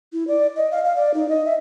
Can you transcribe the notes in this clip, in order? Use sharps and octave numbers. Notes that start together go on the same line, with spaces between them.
E4
D5
D#5
F5
F5
D5
D#4
D#5
E5